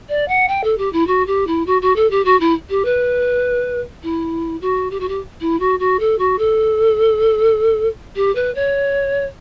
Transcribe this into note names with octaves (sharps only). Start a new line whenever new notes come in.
D5
F#5
G5
A4
G4
E4
F#4
G4
E4
F#4
F#4
A4
G4
F#4
E4
G4
B4
E4
F#4
G4
F#4
G4
E4
F#4
F#4
A4
F#4
A4
G4
B4
C#5